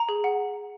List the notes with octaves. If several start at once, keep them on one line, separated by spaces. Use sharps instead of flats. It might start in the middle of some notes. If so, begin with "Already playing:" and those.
Already playing: A#5
G#4
F#5